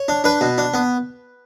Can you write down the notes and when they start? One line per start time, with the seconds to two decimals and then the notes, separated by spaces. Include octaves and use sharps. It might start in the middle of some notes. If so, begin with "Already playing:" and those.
Already playing: C#5
0.08 D4
0.24 D4 B4
0.41 B2
0.58 D4
0.74 B3